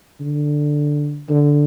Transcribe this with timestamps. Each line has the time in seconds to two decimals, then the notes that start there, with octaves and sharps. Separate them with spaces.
0.21 D3
1.29 D3